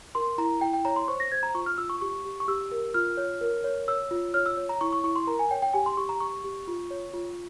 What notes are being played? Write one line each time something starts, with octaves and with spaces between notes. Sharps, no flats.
A#4 C6
E4 A#5
E4 G5
G5
C#5 A#5
C6
C5 C#6
A#6
C5 G#6
A#5
F4 C#6
F6
F4 E6
C#6
G4 C#6
G4
C#6
G4 E6
A#4
F4 F6
C#5
A#4
C#5
C#5 E6
F4
C#5 F6
E6
C#5
A#5
E4 C#6
C#6
E4 C#6
C6
A#4 A#5
G#5
C#5 G5
G5
G4 G#5
C6
G4 C#6
A#5
G4 C#6
G4
F4
C#5
F4